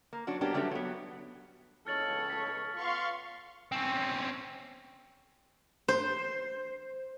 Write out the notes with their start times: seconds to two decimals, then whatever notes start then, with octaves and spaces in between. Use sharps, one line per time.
0.13 A#3
0.27 F#3 D4 F#4
0.41 F#3 A#3 B3 D4 G4
0.54 F#3 G3 A3 D4 G4
0.71 F#3 B3
1.87 C#2 A4 C#5 F6 A6 F#7
2.30 B6
2.75 B3 F4 F5 C6 C#6
3.72 C4 C#4
5.88 C5